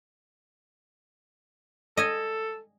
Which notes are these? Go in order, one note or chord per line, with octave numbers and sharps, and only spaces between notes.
A4 D#5 G#5